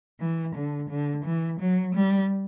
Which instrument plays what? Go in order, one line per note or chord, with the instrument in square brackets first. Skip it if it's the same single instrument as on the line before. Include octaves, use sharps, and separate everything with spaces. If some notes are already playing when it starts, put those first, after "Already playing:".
[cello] E3
D3
D3
E3
F#3
G3